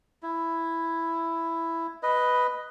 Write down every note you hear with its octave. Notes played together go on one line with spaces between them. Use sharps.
E4
B4 D#5